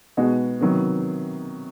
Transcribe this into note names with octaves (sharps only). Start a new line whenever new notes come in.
B2 G#3 B3 D#4 F#4
C3 D#3 F#3 B3